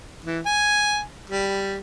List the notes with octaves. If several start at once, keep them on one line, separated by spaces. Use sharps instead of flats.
E3
G#5
G3